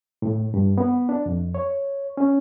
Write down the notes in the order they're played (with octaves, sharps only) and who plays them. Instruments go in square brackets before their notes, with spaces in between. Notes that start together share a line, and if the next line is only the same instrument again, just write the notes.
[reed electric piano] A2
G2
B3
D4
F2
C#5
C#4